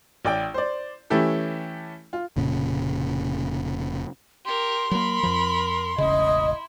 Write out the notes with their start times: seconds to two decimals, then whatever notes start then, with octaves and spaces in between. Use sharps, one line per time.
0.25 A1 D5 G5
0.54 C5 D5
1.10 E3 A3 C#4 E4 G4 A4
2.13 F4
2.36 F1 A#2 C#3
4.45 G4 A#4 C6
4.91 F#3 A#3 A#4 B5
5.23 F2 F3
5.98 E1 A1 C#3 E4 D#5